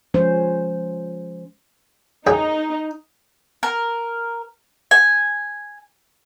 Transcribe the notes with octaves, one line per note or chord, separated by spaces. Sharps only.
F3 G#3 C#4 C5
F#2 D#4 G#4 G5
A#4
G#5